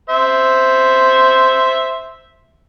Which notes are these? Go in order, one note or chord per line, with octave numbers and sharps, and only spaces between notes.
C5 E5